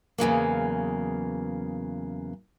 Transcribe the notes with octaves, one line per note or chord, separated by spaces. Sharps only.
E2 C#3 F#3 A#3